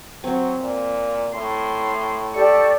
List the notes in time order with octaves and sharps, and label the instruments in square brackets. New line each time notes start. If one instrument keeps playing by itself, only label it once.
[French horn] F#3 [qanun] C4
[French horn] A#2
[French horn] A2 [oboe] C6
[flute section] G4 A4 D5 [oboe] C#6